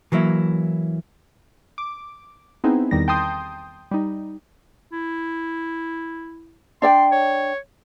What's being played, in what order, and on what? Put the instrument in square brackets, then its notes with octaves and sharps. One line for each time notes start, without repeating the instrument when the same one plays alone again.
[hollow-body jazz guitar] E3 F#3 A#3 E4
[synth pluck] D6
B3 C4 D#4 E4 G#4
E2 D#3 G3 A#6
G5 A5 C6 D#6 G6
G3 D#4
[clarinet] E4
[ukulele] D4 D5 G5 [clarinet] C6
[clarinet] C#5